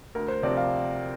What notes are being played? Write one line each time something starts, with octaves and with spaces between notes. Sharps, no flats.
D2 A#4
C5
C3 F3 C4 D5
F5